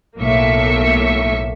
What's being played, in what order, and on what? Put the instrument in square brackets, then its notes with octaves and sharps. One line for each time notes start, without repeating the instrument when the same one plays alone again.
[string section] B1 A2 A#3 E5 C#6